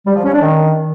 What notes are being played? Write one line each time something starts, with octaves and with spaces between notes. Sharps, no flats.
G3
F3
C#4
D4
D#3